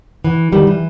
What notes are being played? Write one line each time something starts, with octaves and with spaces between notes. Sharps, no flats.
E3
D#3 G3
E3